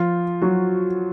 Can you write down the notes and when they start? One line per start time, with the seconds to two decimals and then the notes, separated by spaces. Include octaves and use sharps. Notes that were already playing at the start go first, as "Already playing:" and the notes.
Already playing: F3 F4
0.42 F#3 F#4